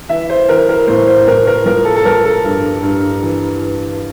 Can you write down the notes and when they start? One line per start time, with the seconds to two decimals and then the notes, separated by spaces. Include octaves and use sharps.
0.09 E3 E5
0.30 C5
0.49 E3 A#4
0.69 A#4
0.87 A2 C5
1.07 C5
1.27 A2 A#4
1.47 A#4
1.65 F3 A#4
1.85 A4
1.96 A4
2.05 F3 A#4
2.25 A4
2.44 G2
2.83 G2
3.23 E3
3.62 E3